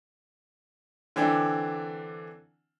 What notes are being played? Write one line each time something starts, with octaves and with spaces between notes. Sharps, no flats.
D3 E3 C4 D4